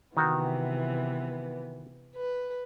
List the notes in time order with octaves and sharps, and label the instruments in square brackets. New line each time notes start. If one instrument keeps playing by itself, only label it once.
[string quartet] C3 E3 B3 [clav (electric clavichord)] D#3 F#4
[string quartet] B4